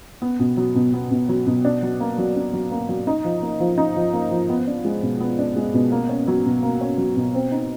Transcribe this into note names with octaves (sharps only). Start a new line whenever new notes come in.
B3
B2
F#3
B2
B3
B2
F#3
B2
D4
F#3
A#3
F#3
D4
F#3
A#3
F#3
D#4
F3
A#3
F3
D#4
F3
A#3
F3
B3
D4
G#3
B2
B3
D4
G#3
B2
A#3
C#4
F#3
B2
A#3
C#4
F#3
B2
C4
D#4